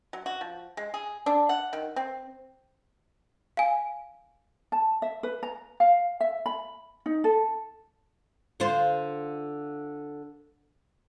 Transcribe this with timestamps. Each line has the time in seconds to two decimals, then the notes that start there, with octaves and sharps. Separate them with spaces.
0.13 F#3
0.26 F#4
0.41 F3
0.77 G#3
0.94 G#4
1.26 D4
1.49 F#5
1.73 D#3
1.96 C4
3.57 F5 G#5
4.72 A5
5.02 E5
5.23 B4
5.43 A#5
5.80 F5
6.20 E5
6.46 B5
7.06 D#4
7.24 A4
8.60 D3 F4 C5